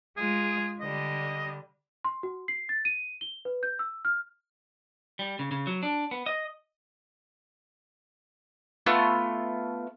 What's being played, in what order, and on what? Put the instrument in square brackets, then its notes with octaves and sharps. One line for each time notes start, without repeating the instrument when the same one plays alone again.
[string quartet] G#3 F4 [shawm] G#4
[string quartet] D3 G3 [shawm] D#5
[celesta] C6
F#4
C7
A6
D#7
G7
B4
G6
E6
F6
[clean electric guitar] G3
C#3
C#3
F#3
D4
B3
D#5
[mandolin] A3 B3 F4